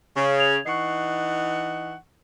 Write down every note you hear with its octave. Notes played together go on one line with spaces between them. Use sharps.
C#3 C#6
G#6 F7
E3 D#4 F#5 C#6 C7